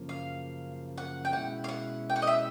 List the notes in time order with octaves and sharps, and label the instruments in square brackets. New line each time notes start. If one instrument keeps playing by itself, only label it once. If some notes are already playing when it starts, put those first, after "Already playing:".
Already playing: [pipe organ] F#2 C#3 F3 A#3
[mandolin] F5
F#5
G5
[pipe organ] B2 G#3 C#4 E4 [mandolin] F#5
[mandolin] F5
F#5
G5
F#5
D#5
E5